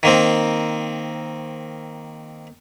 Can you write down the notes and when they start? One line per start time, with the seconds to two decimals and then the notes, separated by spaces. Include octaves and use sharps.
0.03 D#3 A#3 C4